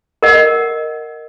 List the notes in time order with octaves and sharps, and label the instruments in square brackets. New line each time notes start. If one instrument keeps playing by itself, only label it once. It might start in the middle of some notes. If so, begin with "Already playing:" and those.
[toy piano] A#4 D#5 F#5